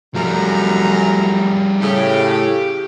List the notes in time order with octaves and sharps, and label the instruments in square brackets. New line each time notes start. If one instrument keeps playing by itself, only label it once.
[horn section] F#2 A3 A#5 [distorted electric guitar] F3 G3
[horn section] A2 C#3 [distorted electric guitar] G4